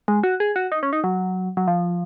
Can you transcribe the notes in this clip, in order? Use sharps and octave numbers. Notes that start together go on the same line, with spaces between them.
G#3
F#4
G#4
F#4
D#4
C#4
D#4
F#3
F#3
F3